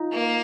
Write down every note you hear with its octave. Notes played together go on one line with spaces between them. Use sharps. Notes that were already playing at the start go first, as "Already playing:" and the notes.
Already playing: D#4 F4
A#3